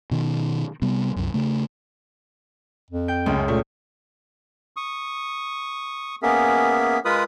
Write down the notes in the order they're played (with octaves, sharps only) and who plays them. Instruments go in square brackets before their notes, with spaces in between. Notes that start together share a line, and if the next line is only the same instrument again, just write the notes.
[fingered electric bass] B2 D#3
C3 G3 B3
C2 F#2
C#3 A3
[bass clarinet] F2
[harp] G5
[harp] C#2 G#3 [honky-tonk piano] F#2
[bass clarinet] A#2 [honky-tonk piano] A3
[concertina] C#6 D#6
A#3 B3 C#4 G#4 A#4 E5
G#3 F4 A#4 B4 B5 D#6